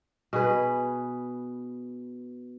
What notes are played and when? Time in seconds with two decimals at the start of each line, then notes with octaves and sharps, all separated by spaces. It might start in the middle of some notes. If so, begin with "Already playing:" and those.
0.33 B2 G#4 B4